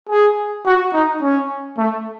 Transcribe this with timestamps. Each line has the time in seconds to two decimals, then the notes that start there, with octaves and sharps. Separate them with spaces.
0.09 G#4
0.66 F#4
0.94 D#4
1.22 C#4
1.78 A3